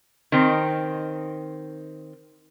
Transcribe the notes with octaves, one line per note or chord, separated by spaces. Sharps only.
D#3 C4